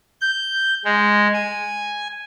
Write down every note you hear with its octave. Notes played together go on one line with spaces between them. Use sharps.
G6
G#3
G#5